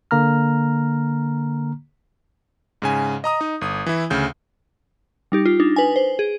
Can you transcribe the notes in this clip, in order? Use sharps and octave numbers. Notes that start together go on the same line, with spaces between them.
D3 A#3 A#5 F6
G#2 C#3 G#5
D#5 A#5 D#6
D#4
G1 D#6
E3 E4
D2 C#3 G6
G3 D#4 G4
F4
D4 D#4
B4 G#5
C5
G#4